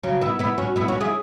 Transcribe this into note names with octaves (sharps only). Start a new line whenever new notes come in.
C#3 F#3
B3 E4
B3 E4
C#4 F#4
B3 E4
C#4 F#4
E4 G#4